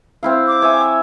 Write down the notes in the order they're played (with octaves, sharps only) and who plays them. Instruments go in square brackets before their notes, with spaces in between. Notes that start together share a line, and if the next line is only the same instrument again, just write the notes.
[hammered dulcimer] C4 E4 F5
[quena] D6
[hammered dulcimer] C#5 E5 G#5